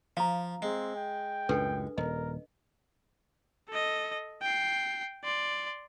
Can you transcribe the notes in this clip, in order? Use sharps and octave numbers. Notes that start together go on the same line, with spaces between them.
F3 F5 A#5
G#3 C4
G5
C#2 F#2 A2 D4 A4 B4
D#1 A#4 D#5
A4 D#5
G5 C7
D5 C6